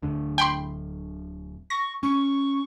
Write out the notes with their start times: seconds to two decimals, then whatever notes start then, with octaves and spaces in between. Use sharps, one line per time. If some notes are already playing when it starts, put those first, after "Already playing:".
0.02 D1 D3
0.38 G5 B5 C6
1.70 C#6 A#6
2.03 C#4 C#6